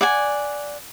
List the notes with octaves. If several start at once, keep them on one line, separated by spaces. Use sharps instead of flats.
D5 F#5 G#5